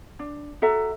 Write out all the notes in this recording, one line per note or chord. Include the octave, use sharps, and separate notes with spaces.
D4
F#4 A4 E5 A#5